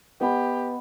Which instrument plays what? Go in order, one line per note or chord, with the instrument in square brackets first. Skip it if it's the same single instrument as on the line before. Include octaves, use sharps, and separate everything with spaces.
[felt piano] B3 [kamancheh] G4 [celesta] D#5 F#5 B5